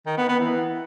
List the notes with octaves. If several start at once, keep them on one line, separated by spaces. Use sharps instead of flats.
D#3
B3
B3
E3